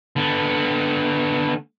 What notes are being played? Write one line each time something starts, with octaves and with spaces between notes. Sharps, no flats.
D3 B3